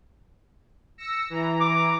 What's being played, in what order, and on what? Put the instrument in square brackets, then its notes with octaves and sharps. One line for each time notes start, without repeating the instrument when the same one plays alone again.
[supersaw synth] E6 A#6 C#7
E3 A#5
[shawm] D6